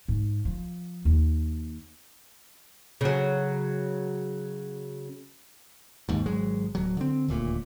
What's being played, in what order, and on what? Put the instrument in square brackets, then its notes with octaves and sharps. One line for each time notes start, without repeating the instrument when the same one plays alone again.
[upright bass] G#2
F3
D#2
[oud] C#3 F#3
[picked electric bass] D#2 G#2
G#1 F#3 G#3
D1 F#3
D3 C4
D#1 D2 A#2